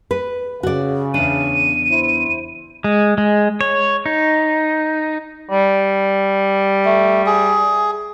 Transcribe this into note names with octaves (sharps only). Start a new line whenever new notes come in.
B4
C#3 F#4 D5
E2 D4 D#7
E4 C5
G#3
G#3
C#5
D#4
G3
A3
G#4